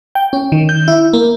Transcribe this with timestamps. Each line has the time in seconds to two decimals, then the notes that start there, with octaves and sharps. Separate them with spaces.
0.15 G5
0.33 C#4
0.52 D#3
0.69 G6
0.88 E4
1.13 A#3